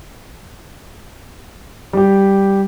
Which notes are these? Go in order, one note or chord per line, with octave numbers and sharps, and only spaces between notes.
G3 G4